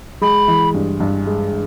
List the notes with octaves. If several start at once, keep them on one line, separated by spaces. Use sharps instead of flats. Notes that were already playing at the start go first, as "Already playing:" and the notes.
G#3 B5
E3
G2
G2
G#3